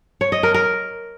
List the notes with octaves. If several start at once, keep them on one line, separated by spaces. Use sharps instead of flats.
C#5
D#5
A#4
A#4